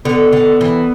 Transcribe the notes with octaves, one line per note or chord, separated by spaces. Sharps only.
D3 B3
D3
E3